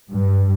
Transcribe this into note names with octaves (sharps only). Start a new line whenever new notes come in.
G2